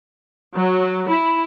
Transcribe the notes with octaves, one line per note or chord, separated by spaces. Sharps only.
F#3
E4